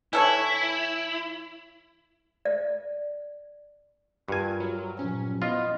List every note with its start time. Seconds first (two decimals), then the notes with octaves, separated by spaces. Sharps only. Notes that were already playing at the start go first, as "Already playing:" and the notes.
0.13 E3 E4 A4 C#5
2.45 D5
4.28 G2 F4 A#4 G#5
4.60 F#3
4.99 A#2 F3 F#3 C#4
5.42 B3 E4 F4 D#5